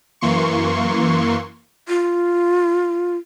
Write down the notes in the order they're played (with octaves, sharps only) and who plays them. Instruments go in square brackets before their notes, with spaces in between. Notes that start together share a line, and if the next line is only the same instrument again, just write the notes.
[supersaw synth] F#2 E3 A#3 C6 C#6
[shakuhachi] F4